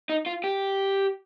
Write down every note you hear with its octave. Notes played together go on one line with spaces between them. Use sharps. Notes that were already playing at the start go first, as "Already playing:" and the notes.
D#4
F4
G4